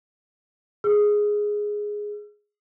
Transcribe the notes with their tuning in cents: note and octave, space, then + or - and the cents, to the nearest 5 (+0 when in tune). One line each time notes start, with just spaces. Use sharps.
G#4 +0 E6 +45